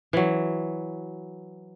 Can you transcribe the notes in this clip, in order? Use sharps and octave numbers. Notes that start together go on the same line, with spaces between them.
E3 F#3